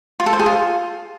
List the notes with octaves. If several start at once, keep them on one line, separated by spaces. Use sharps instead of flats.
F4
A4
C5
G#4
F4